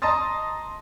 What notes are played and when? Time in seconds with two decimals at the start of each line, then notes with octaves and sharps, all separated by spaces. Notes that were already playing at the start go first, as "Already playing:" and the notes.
0.02 D#5 A5 A#5 C6 D#6 A6